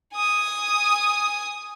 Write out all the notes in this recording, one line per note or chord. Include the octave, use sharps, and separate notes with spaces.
G#5 D#6